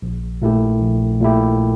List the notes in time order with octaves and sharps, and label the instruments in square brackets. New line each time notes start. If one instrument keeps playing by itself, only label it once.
[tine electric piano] A#1
A#2 A3 E4 G4
A#1
A#2 A3 E4 G4